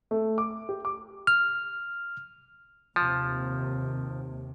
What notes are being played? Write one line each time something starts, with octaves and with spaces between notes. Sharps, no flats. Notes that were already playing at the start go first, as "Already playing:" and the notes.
A3
D6
G4
D6
F6
D#2 C3 F3